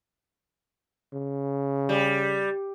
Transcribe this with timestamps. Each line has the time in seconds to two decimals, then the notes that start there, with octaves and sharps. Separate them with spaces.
1.14 C#3
1.89 G3